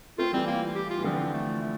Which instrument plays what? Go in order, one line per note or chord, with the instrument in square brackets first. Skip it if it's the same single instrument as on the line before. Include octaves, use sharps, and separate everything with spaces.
[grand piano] A3 C4 [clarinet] F4
[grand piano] E3 G3 [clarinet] C4
[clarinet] A#3
G4
F4
[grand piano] E3
[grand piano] D3 F3 [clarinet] C4
[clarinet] A3
A3